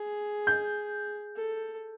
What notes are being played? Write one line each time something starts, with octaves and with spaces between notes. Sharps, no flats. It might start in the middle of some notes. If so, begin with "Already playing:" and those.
Already playing: G#4
G6
A4